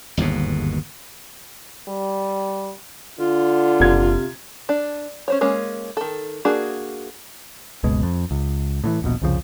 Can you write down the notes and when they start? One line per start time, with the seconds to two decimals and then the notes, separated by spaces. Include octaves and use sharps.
0.17 G1 D#2 G#2 B2
1.88 G3
3.20 D3 F4
3.80 F#1 C3 G#6
4.69 D4
5.28 C#4 C5 C#5
5.41 G#3 A#3 C#4
5.97 D#3 A4
6.45 A#3 D4 F#4 G#4
7.83 F#1 C#2 B2 G#3
8.03 F2
8.31 C#2
8.84 A2 D3 E3
9.02 D#1 A#1 B2
9.22 C2 F2 C#3 F3